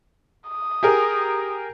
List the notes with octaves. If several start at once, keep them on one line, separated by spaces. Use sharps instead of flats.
D#6
G4 G#4 A#4